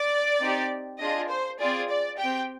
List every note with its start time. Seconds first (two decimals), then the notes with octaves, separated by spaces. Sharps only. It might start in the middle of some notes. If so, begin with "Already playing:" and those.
Already playing: D5
0.40 C4 D#4 G4
0.99 D4 F4 G#4 D#5
1.29 C5
1.59 C4 F4 G#4 D5
1.89 D5
2.18 G4 G5
2.23 C4